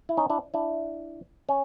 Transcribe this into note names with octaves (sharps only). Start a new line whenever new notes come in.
E4
C#4 D#4
D4 E4
D4 E4
C#4